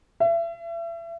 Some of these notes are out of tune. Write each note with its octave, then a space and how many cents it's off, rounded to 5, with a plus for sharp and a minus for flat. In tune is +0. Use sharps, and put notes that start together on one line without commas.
E5 +35